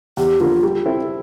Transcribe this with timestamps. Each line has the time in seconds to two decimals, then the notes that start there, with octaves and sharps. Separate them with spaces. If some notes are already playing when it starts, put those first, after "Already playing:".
0.17 E2 G4
0.40 D3 F3 A#3 F4
0.63 G3
0.86 C4 E4 A4